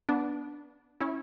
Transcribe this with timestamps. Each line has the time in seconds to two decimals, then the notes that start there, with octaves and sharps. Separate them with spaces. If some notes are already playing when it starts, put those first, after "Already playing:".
0.09 B3 D4
1.00 C#4 E4